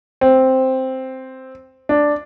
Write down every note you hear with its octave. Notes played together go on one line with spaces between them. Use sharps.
C4
D4